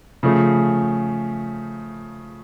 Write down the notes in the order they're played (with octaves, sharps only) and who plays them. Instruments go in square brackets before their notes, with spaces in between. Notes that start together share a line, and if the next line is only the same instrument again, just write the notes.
[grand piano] C#3 F3 A3